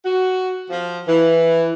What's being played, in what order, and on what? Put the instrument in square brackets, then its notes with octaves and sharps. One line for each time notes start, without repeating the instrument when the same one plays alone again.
[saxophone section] F#4
F3
E3